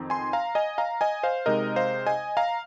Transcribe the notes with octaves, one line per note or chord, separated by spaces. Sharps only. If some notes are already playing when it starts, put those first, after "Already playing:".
Already playing: F2 D#3 C4 D#4
G#5 C6
F5 A#5
D#5 G#5
F5 A#5
D#5 G#5
C5 F5
C3 G#3 D#4 A#4 D#5
C5 F5
D#5 G#5
F5 A#5